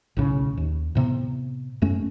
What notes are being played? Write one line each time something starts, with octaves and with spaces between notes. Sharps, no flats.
B1 A2 C#3
D#2
A2 C3 B3
F#2 A3 C#4